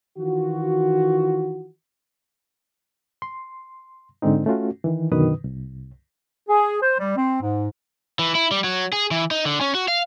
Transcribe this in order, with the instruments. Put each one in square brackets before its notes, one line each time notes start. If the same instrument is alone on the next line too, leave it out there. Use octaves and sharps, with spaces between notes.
[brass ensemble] D#3 E3 F4 F#4
[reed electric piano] C6
G#2 D3 G#3 C4 D#4
A3 C#4 F4 F#4
D#3 E3
F#2 B2 D3 D#3 B4 D#6
C2
[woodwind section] G#4
C5
G3
C4
G#2
[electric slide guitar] E3
E4
G3
F#3
G#4
E3
D#4
D3
C#4
F#4
F5